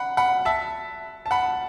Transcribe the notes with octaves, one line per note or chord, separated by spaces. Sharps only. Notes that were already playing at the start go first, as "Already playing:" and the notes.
Already playing: F#5 B5
F#5 B5
E5 A5
A5
F#5 B5